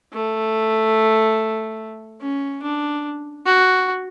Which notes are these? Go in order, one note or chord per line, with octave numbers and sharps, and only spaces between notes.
A3
C#4
D4
F#4